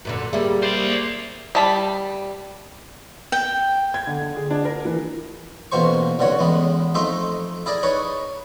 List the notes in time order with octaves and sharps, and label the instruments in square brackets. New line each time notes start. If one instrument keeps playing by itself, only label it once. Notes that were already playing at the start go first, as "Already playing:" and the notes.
[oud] F#2 A#2 D3
[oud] G3 A#3 [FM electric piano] G#4 E5
[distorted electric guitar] C5 D5
[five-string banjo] G3 A5 B5
[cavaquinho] G5
[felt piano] G#6
D3
D3
G#4
D4
A#4
E3
[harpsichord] A1 B2 A#3 C5 C#6
C2 G2 D3 F#4 C#5
A1 E2 G#3 B3
F2 A3 D#4 E5 C6
E4 G#4 A#4 D5
D#4 G#4 B4 C#5